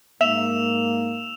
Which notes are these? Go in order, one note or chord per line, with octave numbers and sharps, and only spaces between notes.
G#2 A#3 E5 E6 E7 F7